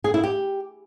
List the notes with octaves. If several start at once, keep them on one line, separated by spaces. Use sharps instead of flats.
G#4
E4
G4